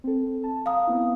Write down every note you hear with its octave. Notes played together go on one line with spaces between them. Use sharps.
C4 A4
A5
F5 A#5 D#6
B3 C4 E4